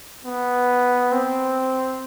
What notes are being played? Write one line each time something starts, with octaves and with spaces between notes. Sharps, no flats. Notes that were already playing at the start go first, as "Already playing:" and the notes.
B3
C4